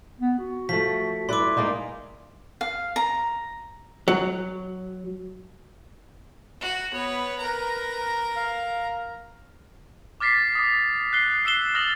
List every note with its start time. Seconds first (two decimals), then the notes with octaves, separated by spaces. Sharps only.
0.20 B3
0.38 F#4
0.69 F3 A3 B6
1.29 E4 B4 D5 C6 D6
1.57 G#3 A#3 D#4 D5
2.61 F5
2.96 A#5
4.08 F#3
6.61 F#4
6.93 B3 B4 C#5
7.39 A#4 B4 A#5
8.36 F5
10.20 D6 F6 A6 B6 C7
10.55 D6 D#6
11.13 F#6 C7 G7
11.45 E6 C7 E7 G7
11.74 D#6 F6 A6 A#6 F7 F#7